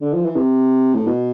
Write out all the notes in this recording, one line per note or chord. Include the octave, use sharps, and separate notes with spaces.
D3
F3
E3
C3
A2
B2